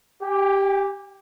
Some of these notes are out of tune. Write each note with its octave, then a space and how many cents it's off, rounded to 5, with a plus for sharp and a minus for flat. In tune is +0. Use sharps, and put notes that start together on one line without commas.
G4 +0 G#5 -45